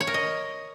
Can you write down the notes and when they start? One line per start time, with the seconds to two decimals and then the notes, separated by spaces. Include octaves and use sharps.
0.01 C#5
0.07 A#4
0.14 D#5